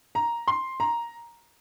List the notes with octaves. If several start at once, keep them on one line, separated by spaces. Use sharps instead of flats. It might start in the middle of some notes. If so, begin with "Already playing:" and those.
A#5
C6
A#5